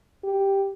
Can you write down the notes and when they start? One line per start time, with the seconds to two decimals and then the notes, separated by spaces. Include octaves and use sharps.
0.24 G4